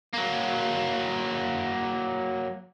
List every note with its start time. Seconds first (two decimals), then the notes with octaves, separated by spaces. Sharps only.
0.13 F#3 A#3